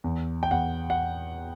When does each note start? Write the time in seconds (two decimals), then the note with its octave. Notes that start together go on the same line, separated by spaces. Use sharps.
0.04 E2
0.43 G5
0.51 E2 F#5
0.90 F#5